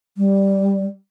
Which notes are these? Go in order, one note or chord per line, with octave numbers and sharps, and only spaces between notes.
G3